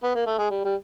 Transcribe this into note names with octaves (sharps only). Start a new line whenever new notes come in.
B3
A#3
A3
G#3
G3
G3